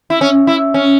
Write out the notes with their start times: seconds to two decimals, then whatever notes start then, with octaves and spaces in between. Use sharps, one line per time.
0.10 E4
0.21 C#4
0.47 E4
0.74 C#4